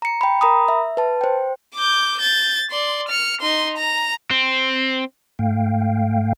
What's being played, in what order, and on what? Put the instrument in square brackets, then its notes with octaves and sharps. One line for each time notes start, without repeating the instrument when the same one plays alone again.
[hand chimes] A#5 C#7
G5 B5
A#4 A#5 B5 D#6
E5
B4 A5
C5 G5
[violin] D6 G6
G6 A6
D5 C6
F6 C#7
D#4 C6
A#5
[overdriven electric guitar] C4
[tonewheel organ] G#2 A3 F5 G5